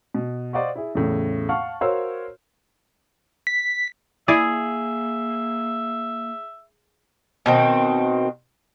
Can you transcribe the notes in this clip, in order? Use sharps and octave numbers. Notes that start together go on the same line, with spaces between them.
B2
C5 D5 D#5 F5 F#5 C#6
E4 G#4
E2 A2 C#3
F5 F#5 A5 C#6 F6
F#4 A#4 C5 C#5 F5 E6
B6
A#3 E4 G#4 D5 E5
B2 D#3 C4